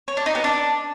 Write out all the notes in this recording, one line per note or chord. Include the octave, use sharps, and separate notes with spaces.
C#5
D4
D#4
B3
D4